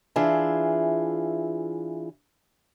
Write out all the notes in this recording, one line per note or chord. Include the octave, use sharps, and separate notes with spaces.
E3 D4 F4 G#4 E5